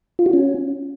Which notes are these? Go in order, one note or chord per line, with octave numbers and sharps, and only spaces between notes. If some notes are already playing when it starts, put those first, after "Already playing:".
F4
F#4
C#4